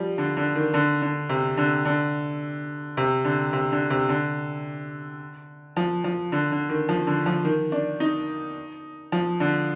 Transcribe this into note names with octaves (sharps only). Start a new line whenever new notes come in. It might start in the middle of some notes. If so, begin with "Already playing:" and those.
Already playing: F3 G3
D3
D3
D#3
D3
D3
C3
D3
D3
C3
D3
C3
D3
C3
D3
F3
F3
D3
D3
D#3
F3
D3
F3
D#3
D4
D#4
F3
D3